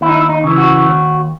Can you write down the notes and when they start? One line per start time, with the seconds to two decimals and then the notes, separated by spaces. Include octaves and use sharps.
0.01 D#2 E4
0.09 D#4
0.16 E4
0.29 D#4
0.44 C#3 E3
0.58 F#4
0.85 D#2